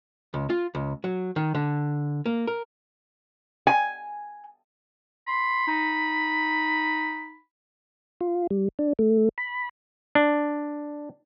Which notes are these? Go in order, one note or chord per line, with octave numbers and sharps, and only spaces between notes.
C#2
F4
C#2
F#3
D#3
D3
A#3
A#4
G#5
B5 C6
D#4
F4
G3
D4
A3
B5
D4